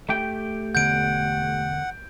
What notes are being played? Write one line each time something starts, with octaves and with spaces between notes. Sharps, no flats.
A3 G4 G5
E1 D3 B3 F#5 G6 D7